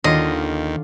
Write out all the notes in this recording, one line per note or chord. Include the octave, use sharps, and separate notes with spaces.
D#2 D3 D#3 C#4 F4 D#5